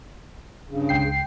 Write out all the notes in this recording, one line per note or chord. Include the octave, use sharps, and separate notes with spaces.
G2 C#3
C#2 G5 C7